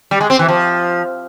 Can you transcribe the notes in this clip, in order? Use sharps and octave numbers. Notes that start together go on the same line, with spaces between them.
G3
G#3
C4
E3
F3